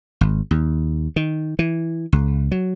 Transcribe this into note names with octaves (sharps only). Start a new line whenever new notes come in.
G#1
D#2
D#3
E3
C#2
F#3